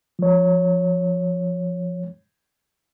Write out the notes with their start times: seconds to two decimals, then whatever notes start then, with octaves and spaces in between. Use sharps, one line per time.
0.19 F3 C#5